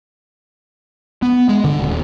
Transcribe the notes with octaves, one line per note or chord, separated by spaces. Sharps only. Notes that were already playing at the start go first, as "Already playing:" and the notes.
B3
G#3
D3
D#1